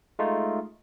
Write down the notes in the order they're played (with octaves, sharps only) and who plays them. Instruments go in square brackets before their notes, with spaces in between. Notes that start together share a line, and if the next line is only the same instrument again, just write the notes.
[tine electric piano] G#3 A3 D#4 F4